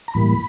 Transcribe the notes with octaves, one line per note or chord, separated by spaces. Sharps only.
A#5
A2 E3 G3 A#3 B5